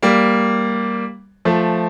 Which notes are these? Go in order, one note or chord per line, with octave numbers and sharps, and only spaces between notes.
G3 A#3
F3 A3